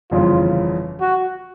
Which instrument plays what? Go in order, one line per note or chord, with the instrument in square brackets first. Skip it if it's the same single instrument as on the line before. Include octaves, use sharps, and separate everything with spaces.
[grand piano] G1 F2 C#3 E3 [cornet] F4
[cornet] F#4